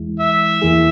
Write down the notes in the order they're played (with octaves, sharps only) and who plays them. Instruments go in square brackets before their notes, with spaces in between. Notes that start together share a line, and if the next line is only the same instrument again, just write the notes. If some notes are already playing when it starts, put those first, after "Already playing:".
Already playing: [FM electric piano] E2 E3 G#3 E4
[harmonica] E5
[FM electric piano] E2 E3 A#3 E4 G#4